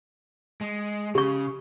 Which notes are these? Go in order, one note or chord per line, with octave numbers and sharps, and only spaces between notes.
G#3
C#3 G4 C#6